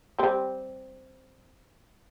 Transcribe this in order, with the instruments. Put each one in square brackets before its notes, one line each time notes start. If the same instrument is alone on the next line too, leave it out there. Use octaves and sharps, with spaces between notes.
[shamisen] G3 C4